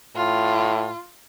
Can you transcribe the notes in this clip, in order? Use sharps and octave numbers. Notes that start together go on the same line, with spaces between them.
A2 F4